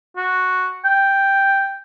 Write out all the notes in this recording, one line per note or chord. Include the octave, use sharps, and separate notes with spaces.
F#4
G5